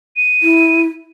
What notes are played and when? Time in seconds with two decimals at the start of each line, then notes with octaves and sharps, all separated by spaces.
0.17 D#7
0.43 E4